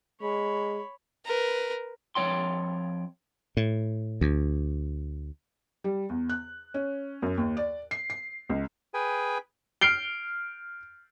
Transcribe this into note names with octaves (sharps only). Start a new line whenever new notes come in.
G#3 C#5 B5
A#4 B4
F2 G3 C#5 G5 C6
A2
D2
G3
E2
F#6
C#4
F#2
D#2
D5
C7
C7
C#2
G#4 B4 G5 G#5
F6 C7 D7 G7